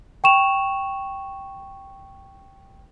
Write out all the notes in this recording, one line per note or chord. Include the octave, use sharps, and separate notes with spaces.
G5 C#6 E7 F7